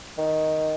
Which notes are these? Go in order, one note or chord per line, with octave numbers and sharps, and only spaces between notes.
D#3